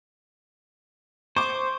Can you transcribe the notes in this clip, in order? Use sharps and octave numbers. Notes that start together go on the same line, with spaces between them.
C5 C#6 D6